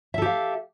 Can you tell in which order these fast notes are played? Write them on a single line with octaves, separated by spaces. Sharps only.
E5 A4 G4 F5